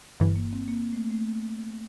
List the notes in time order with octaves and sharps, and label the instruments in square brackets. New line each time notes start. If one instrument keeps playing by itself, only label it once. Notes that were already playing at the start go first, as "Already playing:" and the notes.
[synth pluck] G1 G2 E3
[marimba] A#3
C4
A#3
A3
A3